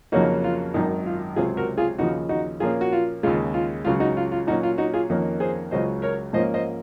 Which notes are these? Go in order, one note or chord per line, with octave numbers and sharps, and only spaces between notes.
F2 C#3 F#3 A#3 C#4 D#4 F#4
F4
G#1 F#2 D#3 D#4
F4
C#2 C3 F#3 C4 F4 G#4
F#4 A#4
F4 G#4
D#2 C#3 F3 D#4 F#4
D#4 F#4
A#2 F3 A#3 C#4 F4 G#4
F#4
F4
D#2 C#3 G#3 F4
F4
C#2 C#3 F#3 F4
D#4 F#4
F4
F4
A#2 F#3 C#4 D#4 F#4
F4
D#4 F#4
F4 G#4
F2 D#3 A#3 C#4
G#4 C5
C#2 C#3 F#3 C5 D#5
A#4 C#5
G#2 F3 A#3 C#4 C5 D#5
C5 D#5